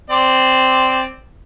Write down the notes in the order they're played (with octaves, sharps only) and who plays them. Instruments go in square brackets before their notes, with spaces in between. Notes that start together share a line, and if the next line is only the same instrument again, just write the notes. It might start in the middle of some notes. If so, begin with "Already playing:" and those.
[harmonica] C4 D5